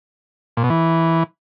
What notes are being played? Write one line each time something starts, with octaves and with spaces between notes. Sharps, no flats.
A#2
B2
E3